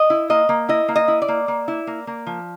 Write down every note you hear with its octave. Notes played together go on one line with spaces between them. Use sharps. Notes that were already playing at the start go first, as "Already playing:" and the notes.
Already playing: D#5
E4
A#3 D#5
A#3
E4 D#5
A#3
D#5
E4
D5
A#3
A#3
E4
A#3
A#3
F3